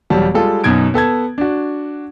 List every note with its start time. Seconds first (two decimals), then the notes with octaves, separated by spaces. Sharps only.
0.10 E1 F#3 G3 A5
0.34 G3 G#3 F4 A4
0.64 F#2 B2 D#4 G#6 D7
0.94 B3 A4 A5 G#6
1.38 D4 F#4